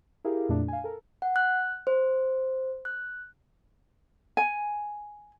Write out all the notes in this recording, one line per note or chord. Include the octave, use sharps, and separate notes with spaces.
E4 G4 G#4 A#4 F5
F2 A#2 A3 D4
F5 G#5
A4 A#4
F#5
F#6
C5
F#6
G#5